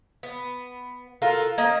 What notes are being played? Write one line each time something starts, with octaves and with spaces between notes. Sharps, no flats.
B3
F4 F#4 A4 A#4
A#3 C#4 D#5